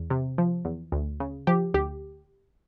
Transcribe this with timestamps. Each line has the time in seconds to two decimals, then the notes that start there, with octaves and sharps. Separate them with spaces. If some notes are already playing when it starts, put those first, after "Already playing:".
Already playing: E2
0.10 C3
0.38 F3
0.65 E2
0.92 D2
1.20 C#3
1.47 F3 G4
1.74 D2 G4